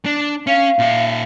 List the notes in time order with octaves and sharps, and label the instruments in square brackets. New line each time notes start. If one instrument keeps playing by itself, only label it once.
[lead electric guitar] D4
[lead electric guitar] C#4 [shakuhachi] F5
[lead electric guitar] A#2 E5